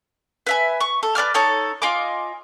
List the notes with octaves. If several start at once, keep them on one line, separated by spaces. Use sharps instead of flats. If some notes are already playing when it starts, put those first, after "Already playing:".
B4 E5 G#5
C#6
A4
B4 D5 D6 F6
D#4 A4 C#5 A5
F4 D#5 G#5 D6